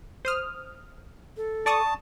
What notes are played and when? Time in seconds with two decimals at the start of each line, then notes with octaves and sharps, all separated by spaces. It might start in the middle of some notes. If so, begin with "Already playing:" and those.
0.25 C5 D#6 F6
1.37 A4
1.66 D5 A5 C#6 D#6